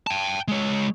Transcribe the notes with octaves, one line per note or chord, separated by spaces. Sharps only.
G5 A5
G#3 C#5